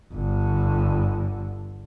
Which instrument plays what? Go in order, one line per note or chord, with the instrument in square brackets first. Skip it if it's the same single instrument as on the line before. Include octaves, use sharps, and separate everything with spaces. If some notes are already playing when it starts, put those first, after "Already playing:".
[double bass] G1 D3